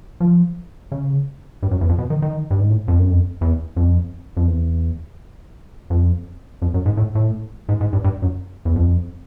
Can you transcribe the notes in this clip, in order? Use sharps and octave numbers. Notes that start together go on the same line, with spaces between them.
F3
C#3
G2
F#2
E2
F2
B2
D#3
D#3
G2
G#2
A2
F2
F#2
F2
E2
F2
F2
E2
F2
F2
F#2
G#2
A2
A2
G#2
G#2
G2
G2
F#2
E2
F2